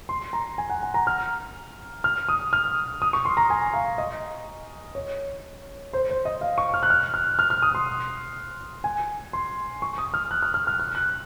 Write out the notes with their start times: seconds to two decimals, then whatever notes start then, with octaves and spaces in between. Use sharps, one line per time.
0.09 C6
0.33 A#5
0.58 G#5
0.70 F#5
0.83 G#5
0.94 A#5
1.07 F6
2.04 F6
2.29 D#6
2.53 F6
3.02 D#6
3.13 C#6
3.25 C6
3.37 A#5
3.50 G#5
3.73 F5
3.98 D#5
4.95 C#5
5.93 C5
6.10 C5
6.25 D#5
6.41 F5
6.58 C#6
6.74 F6
6.83 F#6
6.90 F6
7.14 F6
7.39 F6
7.50 F6
7.62 D#6
7.75 C6
8.84 G#5
9.33 C6
9.82 C#6
9.98 D#6
10.14 F6
10.31 F#6
10.43 F6
10.54 F6
10.67 F6
10.80 F6
10.95 F#6